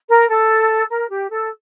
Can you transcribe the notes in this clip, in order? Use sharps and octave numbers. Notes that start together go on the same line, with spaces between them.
A#4
A4
A#4
G4
A4